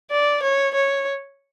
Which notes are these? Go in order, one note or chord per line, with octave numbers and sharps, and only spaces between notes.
D5
C#5
C#5